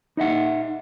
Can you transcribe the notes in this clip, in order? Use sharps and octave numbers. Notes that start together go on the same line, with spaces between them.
D#4 D#5 E5 F#5